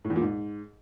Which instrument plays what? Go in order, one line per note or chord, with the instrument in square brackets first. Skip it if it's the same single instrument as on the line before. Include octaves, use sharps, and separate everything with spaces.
[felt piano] A2
E2
A#2
G#2